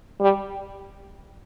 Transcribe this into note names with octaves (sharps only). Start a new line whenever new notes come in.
G3